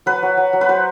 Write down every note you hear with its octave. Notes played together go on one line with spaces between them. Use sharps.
F#3 B4
F#3
F#3
F#3
B4
F#3 C5